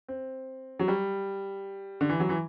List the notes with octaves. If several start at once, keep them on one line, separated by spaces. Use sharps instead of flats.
C4
F#3
G3
D3
E3
F#3
E3